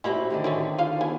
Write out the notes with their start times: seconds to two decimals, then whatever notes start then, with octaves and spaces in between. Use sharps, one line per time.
0.04 C#4 D#4 E4 F#4 G4 C5
0.30 D3 D#3 D4
0.44 E3 C4 C#4
0.78 F4 C5 F5
1.01 B3 G#5